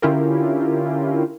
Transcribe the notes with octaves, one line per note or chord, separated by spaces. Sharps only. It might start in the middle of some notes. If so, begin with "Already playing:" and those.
D3 C#4 E4 F4 G4 A#4